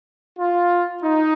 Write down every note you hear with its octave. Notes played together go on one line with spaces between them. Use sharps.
F4
D#4